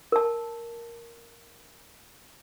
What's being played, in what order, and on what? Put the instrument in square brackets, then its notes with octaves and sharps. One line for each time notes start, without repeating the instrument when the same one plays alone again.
[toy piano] A#4 A5